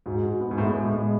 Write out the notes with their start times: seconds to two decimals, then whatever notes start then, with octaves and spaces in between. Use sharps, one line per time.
0.06 G#2 F#4
0.23 F#4
0.41 B3
0.51 G#2
0.58 A2 B3
0.76 G#3
0.85 A2
0.93 G#3